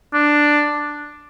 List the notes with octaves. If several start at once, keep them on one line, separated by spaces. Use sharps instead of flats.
D4